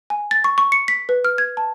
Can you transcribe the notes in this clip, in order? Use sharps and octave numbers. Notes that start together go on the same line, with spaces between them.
G#5
A6
C#6
C#6
C#7
B6
B4
F6
G#6
A5